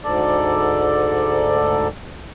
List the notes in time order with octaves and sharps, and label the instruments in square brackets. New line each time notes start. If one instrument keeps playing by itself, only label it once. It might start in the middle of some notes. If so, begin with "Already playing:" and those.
[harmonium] D2 G#2 A4 D5